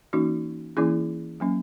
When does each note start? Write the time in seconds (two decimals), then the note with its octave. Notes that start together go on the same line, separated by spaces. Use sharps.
0.13 E3 A#3 C#4 D#4 F#4
0.77 E3 A#3 C#4 E4 G#4
1.40 F#3 A#3 C#4